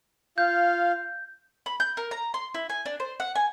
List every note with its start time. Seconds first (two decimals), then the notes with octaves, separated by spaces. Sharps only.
0.38 F4 F5 G6
1.66 B5
1.80 G6
1.97 A#4
2.11 A#5
2.34 C6
2.54 E4
2.70 G#5
2.86 D4
3.00 C5
3.20 F#5
3.35 G#5